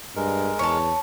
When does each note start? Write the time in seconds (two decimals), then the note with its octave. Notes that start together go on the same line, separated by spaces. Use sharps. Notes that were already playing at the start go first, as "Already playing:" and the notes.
0.16 G2 G#3 A#4
0.59 E2 C#5 A5